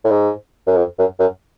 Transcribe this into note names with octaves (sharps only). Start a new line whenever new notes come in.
A2
G#2
F#2
F2
F#2
F#2